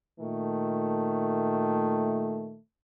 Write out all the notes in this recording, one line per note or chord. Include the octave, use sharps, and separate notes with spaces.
A#2 D#3 A3